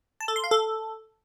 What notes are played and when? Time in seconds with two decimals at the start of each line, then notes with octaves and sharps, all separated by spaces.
0.20 A5
0.28 A4
0.36 C6
0.44 F5
0.51 A4